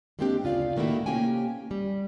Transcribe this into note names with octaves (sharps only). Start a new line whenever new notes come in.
G3 G#3 A#3 C4 D4 G4
D2 C#3 F4 D5 F5
A2 D#3 A3 A#3 E4 F#4
C3 A#3 C#4 G4 G5 G#5
G3